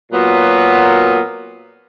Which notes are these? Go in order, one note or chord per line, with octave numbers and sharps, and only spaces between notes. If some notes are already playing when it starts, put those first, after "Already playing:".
A#2 F#3 B3